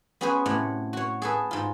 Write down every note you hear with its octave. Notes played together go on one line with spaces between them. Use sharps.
B3 C#4 F#4 G#4 B4 C5
A2 C3 F#5
F#4 C#5
G#4 A4 B4
G#2 F4